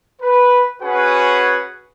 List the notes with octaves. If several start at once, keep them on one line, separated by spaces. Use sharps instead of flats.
B4
C#4 F#4 G#4 B4 F#5 G#5